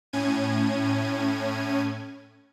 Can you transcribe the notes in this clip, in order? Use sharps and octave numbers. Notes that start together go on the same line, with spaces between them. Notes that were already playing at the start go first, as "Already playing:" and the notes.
A2 C#4 G#6 D#7